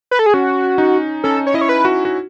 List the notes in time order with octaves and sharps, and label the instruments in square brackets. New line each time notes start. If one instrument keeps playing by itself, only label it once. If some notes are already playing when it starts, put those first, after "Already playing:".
[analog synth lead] B4
A4
G#4
[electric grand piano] C#4 [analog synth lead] F#4
[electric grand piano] D#4
[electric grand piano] C#4 [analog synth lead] A4
[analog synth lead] C#5
[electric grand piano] E4 [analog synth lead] D#5
[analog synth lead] C#5
B4
[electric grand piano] F#4
F#4